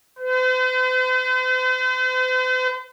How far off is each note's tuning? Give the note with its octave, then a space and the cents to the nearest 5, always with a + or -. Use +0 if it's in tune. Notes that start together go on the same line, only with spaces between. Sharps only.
C5 -45